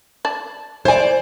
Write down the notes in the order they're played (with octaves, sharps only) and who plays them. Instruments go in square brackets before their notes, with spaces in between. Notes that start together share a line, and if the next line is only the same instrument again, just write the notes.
[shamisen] D5 A5
[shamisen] E4 G#5 [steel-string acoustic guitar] C5 D5